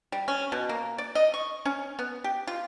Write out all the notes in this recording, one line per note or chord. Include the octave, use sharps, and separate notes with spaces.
G3
C#4
B2
A#3
D5
D#5
C#6
C#4
B3
G4
F4